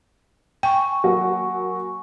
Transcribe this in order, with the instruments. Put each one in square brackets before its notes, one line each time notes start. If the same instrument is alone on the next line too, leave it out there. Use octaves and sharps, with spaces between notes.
[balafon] G5 [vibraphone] G#5 C#6
[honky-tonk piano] F#3 A#3 F#4